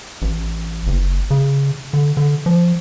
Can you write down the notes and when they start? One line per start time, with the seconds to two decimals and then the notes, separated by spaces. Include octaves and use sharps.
0.22 A1
0.87 F#1
1.30 C#3
1.93 D3
2.17 D3
2.46 F3